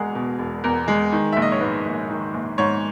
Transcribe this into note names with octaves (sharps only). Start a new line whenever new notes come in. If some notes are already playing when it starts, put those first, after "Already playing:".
Already playing: E1 E2 G#3 G#4 A#4 F#5
B2
E1
E2 A#4
G#3
D#3
A#1 E5
D#5
C#5
G#2 B4
A#1
D#3
A#1
G#2 C#5